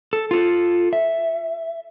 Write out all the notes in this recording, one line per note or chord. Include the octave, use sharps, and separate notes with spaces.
A4
F4 A4
E5